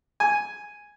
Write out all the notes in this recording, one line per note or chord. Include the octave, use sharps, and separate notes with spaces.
G#5